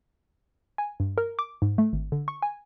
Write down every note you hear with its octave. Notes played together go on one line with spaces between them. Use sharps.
G#5
G2
A#4
D6
G#2
A3
G#1
D3
C#6
G#5